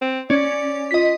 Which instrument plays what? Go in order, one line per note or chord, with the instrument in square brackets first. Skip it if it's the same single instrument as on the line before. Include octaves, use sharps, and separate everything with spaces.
[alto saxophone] C4
[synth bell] C#4 [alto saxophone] D5
[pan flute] F4 [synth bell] D#5 B6